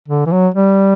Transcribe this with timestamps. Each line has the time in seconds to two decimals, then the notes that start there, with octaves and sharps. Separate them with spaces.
0.08 D3
0.26 E3
0.32 F#3
0.54 G3